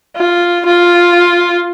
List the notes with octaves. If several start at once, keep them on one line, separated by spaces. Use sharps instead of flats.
F4
F4